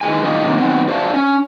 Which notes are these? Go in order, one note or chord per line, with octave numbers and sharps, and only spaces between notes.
D#3 E3 G#3 G#5
A2 D#3 G3 F4 G4 D#5
C3 D#3 F#3 A#3
D#3 F#3 B3 C4
F#4 C5 D5 E5 F5 A5
C#4